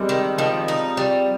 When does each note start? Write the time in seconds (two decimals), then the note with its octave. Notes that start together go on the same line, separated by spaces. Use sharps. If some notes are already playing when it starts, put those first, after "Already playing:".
Already playing: G3 G#3 C4
0.09 D#3
0.38 D#3 F3
0.68 D#4
0.97 G3